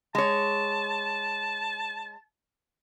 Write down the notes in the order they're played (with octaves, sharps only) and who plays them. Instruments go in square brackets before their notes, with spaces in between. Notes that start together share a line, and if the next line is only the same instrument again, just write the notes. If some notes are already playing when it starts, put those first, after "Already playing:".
[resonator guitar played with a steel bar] G#3 C#5 [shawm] A5